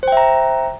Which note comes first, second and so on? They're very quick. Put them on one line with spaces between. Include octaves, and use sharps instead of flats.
C5 G5 E5 A#5